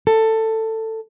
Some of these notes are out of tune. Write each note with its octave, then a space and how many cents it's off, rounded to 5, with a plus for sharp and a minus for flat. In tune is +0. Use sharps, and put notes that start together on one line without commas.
A4 +15